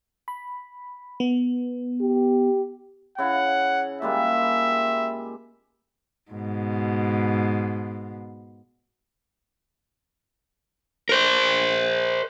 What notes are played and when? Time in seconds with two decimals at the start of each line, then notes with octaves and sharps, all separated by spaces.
0.28 B5
1.20 B3
2.01 G4
3.18 C#3 E4 F#5
4.02 A#2 G3 G#3 E5
6.31 G#2 B2
11.09 A#4 C5